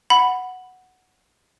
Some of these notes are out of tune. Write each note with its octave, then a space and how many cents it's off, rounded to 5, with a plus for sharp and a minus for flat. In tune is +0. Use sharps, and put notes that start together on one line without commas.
F#5 +0 B5 +0